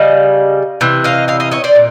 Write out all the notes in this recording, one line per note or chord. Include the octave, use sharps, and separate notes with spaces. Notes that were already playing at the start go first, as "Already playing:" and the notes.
Already playing: C#3 G3 D#5 F5
C3 E3
D#5 F5
D#5 F5
D#5 F5
C#5 D#5
C5 D5
A#2